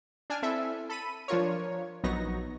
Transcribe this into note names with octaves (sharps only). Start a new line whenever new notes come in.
D4 G#5 F6
C4 E4 A4 E5
A4 B5 D#7
F3 D4 F4 A#4 C#5
A#1 F#3 B3 D#4 C#6 A#6